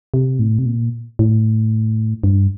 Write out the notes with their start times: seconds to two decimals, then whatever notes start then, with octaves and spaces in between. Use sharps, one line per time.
0.14 C3
0.39 A2
0.59 C3
0.66 A#2
1.19 A2
2.24 G2